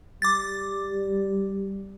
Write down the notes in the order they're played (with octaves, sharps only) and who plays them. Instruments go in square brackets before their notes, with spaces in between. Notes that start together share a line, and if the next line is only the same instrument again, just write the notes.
[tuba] G3 [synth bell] D6 A6